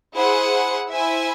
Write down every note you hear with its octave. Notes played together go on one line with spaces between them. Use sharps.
E4 G#4 C5 F#5
E4 C5 E5 G#5